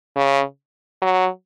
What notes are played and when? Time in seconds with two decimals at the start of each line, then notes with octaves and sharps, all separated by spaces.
0.16 C#3
1.02 F#3